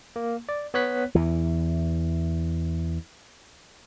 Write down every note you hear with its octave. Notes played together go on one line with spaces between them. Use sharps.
A#3
D5
B3 C#5 F#6 B6
E2 E3